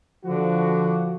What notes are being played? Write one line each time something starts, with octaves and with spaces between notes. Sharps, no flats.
D3 F3 F#4